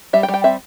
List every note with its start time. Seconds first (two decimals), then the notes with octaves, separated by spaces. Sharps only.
0.13 G3 E5
0.23 G5
0.28 G3
0.34 G5
0.44 C4 E5